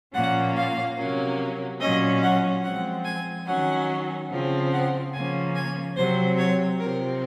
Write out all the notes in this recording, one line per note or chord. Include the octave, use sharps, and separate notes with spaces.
A#2 F3 A#3 C#4 F#5
F5
C3 F#3 A#3 C#4
A#2 F#3 C#4 D#5
F#5
F3 G#3 C4 F#5
G#5
D#3 F#3 C#4 F#5
C#3 F3 C4
F#5
C#3 F3 A#3 C#4 G#5
G#5
C3 F#3 C4 C5
C#5
C3 F3 C4 A#4